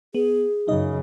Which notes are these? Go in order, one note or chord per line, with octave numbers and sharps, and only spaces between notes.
B3 G#4
F#2 C#3 D#4 D#5